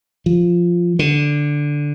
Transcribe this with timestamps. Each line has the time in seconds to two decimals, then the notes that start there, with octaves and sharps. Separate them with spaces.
0.26 F3
0.99 D3